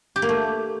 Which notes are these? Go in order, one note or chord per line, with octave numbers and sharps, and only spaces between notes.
G4
A#3
A3